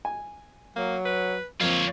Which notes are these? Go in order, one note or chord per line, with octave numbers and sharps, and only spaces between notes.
G#5
F#3 A#3
B4
F2 A#3 C4 F4 C#5